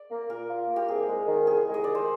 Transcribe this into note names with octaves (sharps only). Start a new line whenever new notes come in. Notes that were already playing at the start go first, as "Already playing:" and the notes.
Already playing: D5
A#3
A#2 A#4
F4
A#3
G4
C2 G#4
G#3
D#3
C2 G#4
G#3
D#5
D#3 D5
C5